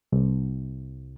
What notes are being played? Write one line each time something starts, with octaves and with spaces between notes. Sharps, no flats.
C2